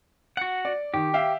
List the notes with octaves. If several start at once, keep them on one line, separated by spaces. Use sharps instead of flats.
F#4 F#5 C#7
D5
D#3 G4
E5 F5 G5